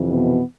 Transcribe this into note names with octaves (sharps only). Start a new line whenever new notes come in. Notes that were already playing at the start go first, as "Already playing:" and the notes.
Already playing: F2 C3 E3
B2 B3